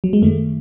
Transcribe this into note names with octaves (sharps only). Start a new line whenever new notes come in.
F#3
G#3
F#2 D#3 A3